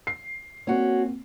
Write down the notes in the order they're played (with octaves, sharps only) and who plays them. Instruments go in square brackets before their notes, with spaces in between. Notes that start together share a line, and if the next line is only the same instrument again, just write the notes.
[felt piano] C7
[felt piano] A#3 C4 [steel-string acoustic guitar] C#4 F#4